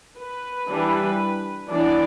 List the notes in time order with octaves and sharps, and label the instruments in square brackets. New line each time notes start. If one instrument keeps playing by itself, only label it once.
[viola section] B4
E3 G3 D4
E3 B3 D4 D5